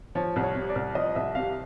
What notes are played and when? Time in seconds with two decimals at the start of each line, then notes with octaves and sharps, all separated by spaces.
0.15 F3 C#5
0.36 C2
0.43 C#5
0.55 C3
0.69 D5
0.75 C2
0.95 F3 D#5
1.15 C2 E5
1.35 C3 F5